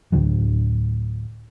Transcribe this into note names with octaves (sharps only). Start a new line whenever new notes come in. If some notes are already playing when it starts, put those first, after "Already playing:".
D2 A2 D3 F#3